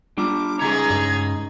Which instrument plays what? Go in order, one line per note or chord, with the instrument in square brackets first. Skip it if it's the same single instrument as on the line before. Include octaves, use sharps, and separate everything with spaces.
[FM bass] G3 [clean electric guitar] D4 F4 [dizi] D6
[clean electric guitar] C#2 C#3 A#5 [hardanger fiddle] D#4 G#4 [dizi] G#6
[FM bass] G2